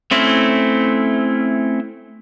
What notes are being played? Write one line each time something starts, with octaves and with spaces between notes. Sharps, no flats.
A3 C4 C#4 E4